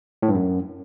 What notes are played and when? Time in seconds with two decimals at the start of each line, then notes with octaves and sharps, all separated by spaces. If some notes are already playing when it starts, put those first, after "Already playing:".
0.22 A2
0.29 G2
0.35 F#2